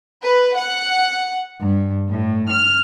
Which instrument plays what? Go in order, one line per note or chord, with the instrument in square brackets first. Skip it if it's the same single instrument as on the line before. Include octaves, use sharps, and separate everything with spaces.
[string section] B4
F#5
G2
A2
F6